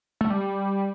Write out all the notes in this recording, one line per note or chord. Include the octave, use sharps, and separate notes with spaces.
A3
G3